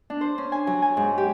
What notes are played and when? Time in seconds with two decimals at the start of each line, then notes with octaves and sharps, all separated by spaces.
0.10 D4
0.21 C5
0.38 C#4
0.52 G#5
0.67 F#3
0.82 G#5
0.97 G#2
1.18 G4